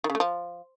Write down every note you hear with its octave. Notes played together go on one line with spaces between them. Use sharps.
D#3
C#3
A3
F3